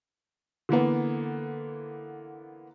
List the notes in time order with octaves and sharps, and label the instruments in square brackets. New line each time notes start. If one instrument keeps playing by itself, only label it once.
[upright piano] D3 E3 A#3 B3